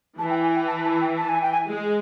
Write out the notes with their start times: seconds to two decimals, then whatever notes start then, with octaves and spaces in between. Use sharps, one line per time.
0.18 E3 A5
0.30 G5
0.42 G#5
0.55 G5
0.67 A5
0.85 A5
1.01 G5
1.17 A5
1.29 G#5
1.42 G5
1.52 G#5
1.67 G#3